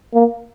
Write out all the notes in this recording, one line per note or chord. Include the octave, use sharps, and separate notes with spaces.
A#3